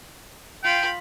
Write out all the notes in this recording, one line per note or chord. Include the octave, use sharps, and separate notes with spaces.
F4 G5 B5